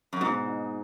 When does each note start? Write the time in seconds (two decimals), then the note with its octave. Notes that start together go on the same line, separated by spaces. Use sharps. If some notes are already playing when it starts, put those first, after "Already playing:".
0.13 F#2
0.21 G#2 B2
0.45 D#4